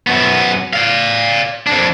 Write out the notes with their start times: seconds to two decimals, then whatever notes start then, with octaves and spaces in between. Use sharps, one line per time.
0.07 F#2 B3
0.73 D5 F5
1.67 F2 D4